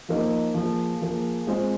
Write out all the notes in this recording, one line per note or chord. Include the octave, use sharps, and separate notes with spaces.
F3 A#3 D#4 C5 D#5
F3 A#3 G#4
F3 A#3 G#4
G#3 C4 F4 C5